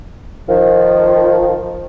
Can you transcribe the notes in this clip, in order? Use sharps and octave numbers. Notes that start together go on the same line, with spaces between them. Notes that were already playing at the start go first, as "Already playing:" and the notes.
D#3 F3